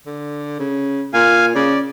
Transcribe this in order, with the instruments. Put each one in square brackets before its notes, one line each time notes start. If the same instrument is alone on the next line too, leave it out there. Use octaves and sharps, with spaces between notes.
[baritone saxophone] D3
C#3
[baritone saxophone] A#2 [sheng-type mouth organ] F5 G#5
[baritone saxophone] C#3 [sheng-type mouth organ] D5